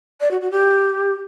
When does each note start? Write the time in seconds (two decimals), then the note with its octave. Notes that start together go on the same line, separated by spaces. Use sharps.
0.21 D5
0.31 F#4
0.41 F#4
0.51 G4